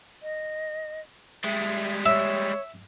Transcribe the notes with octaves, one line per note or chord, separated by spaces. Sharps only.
D#5
G3 G#3 E5
C#5 E5